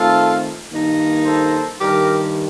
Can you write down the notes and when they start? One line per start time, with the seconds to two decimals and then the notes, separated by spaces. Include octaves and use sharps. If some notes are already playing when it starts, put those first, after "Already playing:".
Already playing: D#3 A3 C4 F4 A4
0.69 G2 D#3 A#3 D#4
1.25 A4 C5
1.79 G2 D#3 G3 G4 A#4